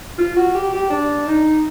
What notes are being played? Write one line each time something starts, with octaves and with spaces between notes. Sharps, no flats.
F4
F#4
G4
G4
D4
D#4